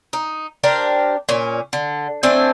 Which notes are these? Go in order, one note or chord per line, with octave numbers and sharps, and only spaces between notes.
D#4
D4 G4 A#4 C5
A#2 C#4
D3
A3 C4 D4 G#5